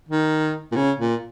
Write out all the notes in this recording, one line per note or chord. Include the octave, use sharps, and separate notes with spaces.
D#3
A#2
C#3
A#2